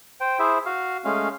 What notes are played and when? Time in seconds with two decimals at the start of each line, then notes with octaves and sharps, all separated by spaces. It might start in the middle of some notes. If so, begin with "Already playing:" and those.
0.20 C5 G5
0.39 E4 G#4 C5 E5
0.66 F#4 F5
1.05 G#3 A3 C#4 F5